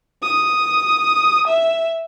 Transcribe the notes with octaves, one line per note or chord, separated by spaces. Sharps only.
D#6
E5